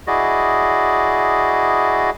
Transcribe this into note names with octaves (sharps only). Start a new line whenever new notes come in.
E4 F#4 G#4 D5 D#5